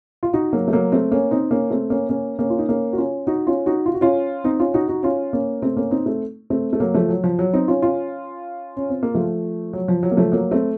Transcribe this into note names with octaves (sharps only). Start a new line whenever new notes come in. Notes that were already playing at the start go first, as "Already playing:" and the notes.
F4
D#4 F#4
F#3 A#3
A3
F#3 A#3
A3 C4
A#3 C#4
C4 D#4
A#3 C#4
A3 C4
A#3 C#4
A#3 C#4
A#3 C#4
F4
D#4
A#3 C#4
F#4
C#4 F4
D#4 F#4
C#4 F4
D#4 F#4
F4
F#4
C#4 F4
C4 D#4
C#4 F4
D#4 F#4
D#4 F#4
C#4 F4
A#3 C#4
A3 C4
A#3 C#4
C4 D#4
A3 C4
A3 C4
A3
F#3 A#3
F3 A3
F#3
F3
F#3
C4 D#4
C#4 F4
C#4 F4
C#4
C4
A#3
F3 A3
F#3
F3
F#3
A#3
F3 A3
F#3 A#3
A3 C4